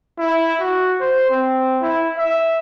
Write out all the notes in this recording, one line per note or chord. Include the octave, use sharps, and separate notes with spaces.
E4
F#4
C5
C4
E4
E5